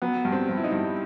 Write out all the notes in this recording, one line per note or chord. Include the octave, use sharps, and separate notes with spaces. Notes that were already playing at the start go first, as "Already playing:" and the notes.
F#3 B3
G2
C4
G2
E4
D#4
G2